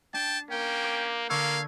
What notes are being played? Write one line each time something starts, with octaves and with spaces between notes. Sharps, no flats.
D4 G5 A5
A#3 C#4 G5
D6 G6
D3 A#3 F5 C#6 E6 G#6